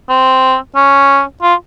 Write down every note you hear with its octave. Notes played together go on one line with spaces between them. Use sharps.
C4
C#4
F4